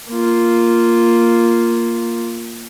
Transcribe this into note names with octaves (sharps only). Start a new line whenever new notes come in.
A#3 F4